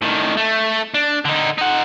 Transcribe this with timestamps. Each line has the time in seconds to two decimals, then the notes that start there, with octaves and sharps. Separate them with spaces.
0.02 A2 D#3
0.37 A3
0.94 D4
1.25 D3 D#4
1.58 D#4 F#5